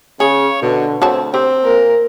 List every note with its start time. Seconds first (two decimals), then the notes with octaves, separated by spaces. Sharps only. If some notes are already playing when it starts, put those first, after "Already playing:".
0.20 C#3 G#4 C#5
0.62 B2 D3
1.02 D2 C4 F#4 C#5 A5
1.34 C4 G4
1.64 A#2 A#4